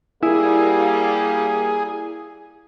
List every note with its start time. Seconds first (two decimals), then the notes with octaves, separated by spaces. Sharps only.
0.23 G3 A#3 E4 G#4